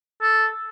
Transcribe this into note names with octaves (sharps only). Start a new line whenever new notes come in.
A4